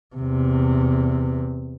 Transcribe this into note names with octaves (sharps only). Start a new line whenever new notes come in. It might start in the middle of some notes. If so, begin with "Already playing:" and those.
E2 C3